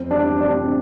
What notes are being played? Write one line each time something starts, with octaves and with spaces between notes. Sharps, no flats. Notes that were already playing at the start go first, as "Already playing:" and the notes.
Already playing: F2 C4
G3 D4
C3 D4